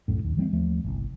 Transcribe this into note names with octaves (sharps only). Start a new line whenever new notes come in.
C2 F#2 A2
D1 D#2
E3 G3 B3 C4
D#2 F3 A3
G1 C2